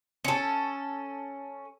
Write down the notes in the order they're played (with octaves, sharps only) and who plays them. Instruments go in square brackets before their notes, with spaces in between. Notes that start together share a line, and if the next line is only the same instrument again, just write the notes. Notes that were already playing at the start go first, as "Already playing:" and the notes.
[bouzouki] C#4 A4